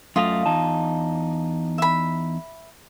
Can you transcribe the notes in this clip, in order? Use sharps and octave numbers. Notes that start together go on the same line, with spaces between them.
F#2 A3 F4 D#5 F5
E2 D#4 A5
E5 B5